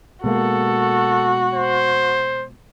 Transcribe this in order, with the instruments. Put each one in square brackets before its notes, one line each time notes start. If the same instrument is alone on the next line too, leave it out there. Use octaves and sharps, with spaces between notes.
[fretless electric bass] B2 G#3 A#3 [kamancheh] F#4 [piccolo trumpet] A4
[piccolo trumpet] C5